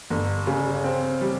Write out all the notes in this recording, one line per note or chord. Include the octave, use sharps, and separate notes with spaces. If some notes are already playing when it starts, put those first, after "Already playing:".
G1
C#3
C4
G3